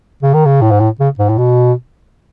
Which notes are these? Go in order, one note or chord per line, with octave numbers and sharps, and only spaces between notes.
C#3
D#3
C#3
A2
G#2
A2
C#3
G#2
A2
B2